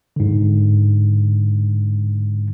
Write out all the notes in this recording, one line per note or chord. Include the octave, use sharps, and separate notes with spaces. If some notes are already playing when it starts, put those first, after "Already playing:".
G#2 D3